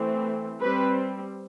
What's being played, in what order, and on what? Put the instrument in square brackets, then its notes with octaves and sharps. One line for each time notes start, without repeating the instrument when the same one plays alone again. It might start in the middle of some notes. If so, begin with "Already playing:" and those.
Already playing: [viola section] E3 A3 C4
G3 C4 B4